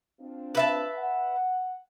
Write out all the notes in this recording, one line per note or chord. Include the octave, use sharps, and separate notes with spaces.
C4 D4 F4
B4 E5 A5
F#5